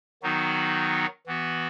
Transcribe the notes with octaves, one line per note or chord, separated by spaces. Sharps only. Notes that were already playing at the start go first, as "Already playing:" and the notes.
D#3 F#3 B3 D#4 F#4
E3 B3 F#4